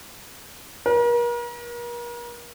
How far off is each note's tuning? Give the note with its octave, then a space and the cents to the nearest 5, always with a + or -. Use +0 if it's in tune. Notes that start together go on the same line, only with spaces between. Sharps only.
A#4 +40